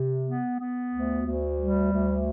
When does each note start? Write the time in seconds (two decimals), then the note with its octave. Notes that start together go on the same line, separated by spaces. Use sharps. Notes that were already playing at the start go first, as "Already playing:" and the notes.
Already playing: C3
0.26 B3
0.59 B3
0.92 D2
1.25 D2
1.59 G3
1.92 D2